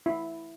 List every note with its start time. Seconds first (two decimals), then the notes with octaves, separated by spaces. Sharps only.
0.06 E4